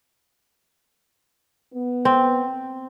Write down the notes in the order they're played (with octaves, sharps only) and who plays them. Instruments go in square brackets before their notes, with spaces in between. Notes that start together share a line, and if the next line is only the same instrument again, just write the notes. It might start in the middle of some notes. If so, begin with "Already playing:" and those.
[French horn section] B3
[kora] C4